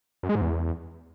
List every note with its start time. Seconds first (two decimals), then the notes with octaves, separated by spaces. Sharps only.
0.23 F#2
0.29 G#3
0.35 G#2
0.41 E2